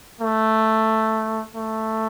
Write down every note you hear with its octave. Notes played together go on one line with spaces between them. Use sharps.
A3
A3